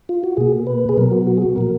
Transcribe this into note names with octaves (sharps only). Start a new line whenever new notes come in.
F4
F#4
B2 A#3 G#4
B4
G#4
B2 F#3 B3 A#4
F#4
F#4
G#4
F#4
A#2 F3 A#3 A#4